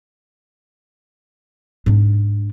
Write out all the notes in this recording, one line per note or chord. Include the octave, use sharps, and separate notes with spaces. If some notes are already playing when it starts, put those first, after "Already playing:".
G#2 D4